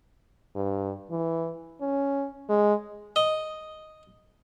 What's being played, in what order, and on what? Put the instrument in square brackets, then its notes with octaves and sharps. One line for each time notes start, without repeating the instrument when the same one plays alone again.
[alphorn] G2
E3
C#4
G#3
[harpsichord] D#5